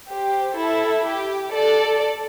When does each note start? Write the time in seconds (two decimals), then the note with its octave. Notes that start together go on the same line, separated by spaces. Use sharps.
0.10 G4 C5
0.58 E4 A4
1.06 G4
1.54 A4 D5